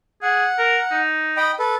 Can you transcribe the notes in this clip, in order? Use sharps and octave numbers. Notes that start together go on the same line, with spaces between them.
G#4 F#5
A#4
D#4
D#5 G5 B5
A4 B4